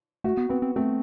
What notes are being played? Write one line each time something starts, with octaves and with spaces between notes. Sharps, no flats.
A3 F#4
B3
B3 C4
C4
A3 C4